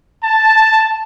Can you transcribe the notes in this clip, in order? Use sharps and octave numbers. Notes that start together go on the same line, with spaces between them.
A5